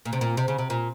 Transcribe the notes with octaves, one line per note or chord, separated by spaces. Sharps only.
A#2
C3
A#2
C3
C#3
C3
A#2